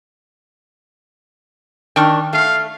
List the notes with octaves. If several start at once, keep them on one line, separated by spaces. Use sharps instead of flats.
D#3 D4 G5 C#6 F6
A3 F5